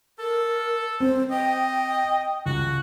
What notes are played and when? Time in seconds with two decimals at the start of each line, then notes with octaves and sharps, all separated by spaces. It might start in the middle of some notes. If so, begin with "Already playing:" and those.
0.19 A4 A#4
1.00 C4 C5
1.31 D#5 G5
2.46 C#2 F#4